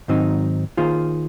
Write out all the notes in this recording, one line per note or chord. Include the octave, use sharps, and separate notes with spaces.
G#2 D#3 F#3 C4 D#4
D#3 A#3 F4 G#4 C5